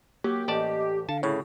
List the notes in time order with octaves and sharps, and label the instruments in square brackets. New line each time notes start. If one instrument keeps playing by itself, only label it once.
[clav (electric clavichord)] F#3 [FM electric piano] A#3 [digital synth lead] G4
[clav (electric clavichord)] A1 D5 A5 [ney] D#5
[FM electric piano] D3 [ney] F5 [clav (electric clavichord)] A5
[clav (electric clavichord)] A2 C#3 [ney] E4 [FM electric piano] C#5